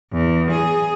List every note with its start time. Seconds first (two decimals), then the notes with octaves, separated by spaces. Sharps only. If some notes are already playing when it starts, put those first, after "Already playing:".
0.12 E2
0.51 G#4